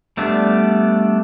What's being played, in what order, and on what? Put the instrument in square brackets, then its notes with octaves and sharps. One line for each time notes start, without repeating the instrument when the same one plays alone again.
[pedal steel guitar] G3 A3 B3 D4